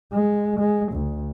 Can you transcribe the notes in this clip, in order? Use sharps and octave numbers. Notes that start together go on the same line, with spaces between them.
G#3
G#3
D2